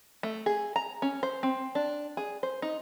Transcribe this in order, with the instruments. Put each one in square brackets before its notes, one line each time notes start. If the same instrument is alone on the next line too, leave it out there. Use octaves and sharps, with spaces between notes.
[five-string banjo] A3
G#4
A#5
C#4
C5
C4
D4
G#4
C5
D#4